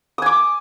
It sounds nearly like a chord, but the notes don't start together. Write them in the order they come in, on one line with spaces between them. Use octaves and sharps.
D#6 G#5 D6